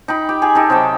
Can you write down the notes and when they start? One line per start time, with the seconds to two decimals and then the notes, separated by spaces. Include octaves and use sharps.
0.08 D#4 G5 B5
0.29 G4
0.42 G4 G#4
0.55 D#4 G4 A4
0.70 C3 F#3 G5 A5